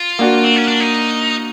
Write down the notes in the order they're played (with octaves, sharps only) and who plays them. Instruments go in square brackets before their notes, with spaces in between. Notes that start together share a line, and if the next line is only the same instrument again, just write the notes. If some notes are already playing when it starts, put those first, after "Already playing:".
Already playing: [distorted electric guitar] F4
[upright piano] A#3 D4 F#4
[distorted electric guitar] C4
C#4
D4
D#4